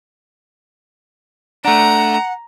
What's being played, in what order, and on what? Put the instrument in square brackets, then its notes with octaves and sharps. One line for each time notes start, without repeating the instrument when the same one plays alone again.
[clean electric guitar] A3 D4 [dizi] F#5 [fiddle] A#5